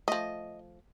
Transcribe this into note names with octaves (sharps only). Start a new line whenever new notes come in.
F3 A3 D#5